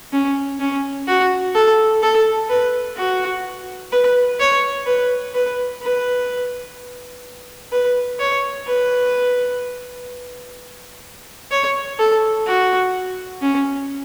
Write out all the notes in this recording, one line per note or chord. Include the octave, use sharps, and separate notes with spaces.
C#4
C#4
F#4
A4
A4
B4
F#4
B4
C#5
B4
B4
B4
B4
C#5
B4
C#5
A4
F#4
C#4